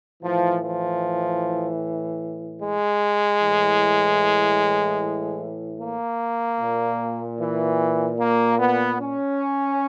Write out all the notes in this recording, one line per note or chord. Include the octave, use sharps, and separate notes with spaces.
A2 E3 F3
F3
G#3
A2 E3
A#3
A#2
E3
A#3
B3
C#4